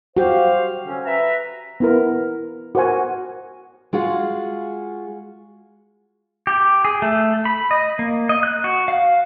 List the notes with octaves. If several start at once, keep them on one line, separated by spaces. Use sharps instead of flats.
F#4 G4 C5 F5
D3 C#4
B4 E5 A#5
B3 E4 A#4
F#4 A#4 C5 F#5 G#5
G#3 F4 F#4 G#4
G4
G#4
A3
B5
D#5
A#3
D#5
F#6
F#4
F5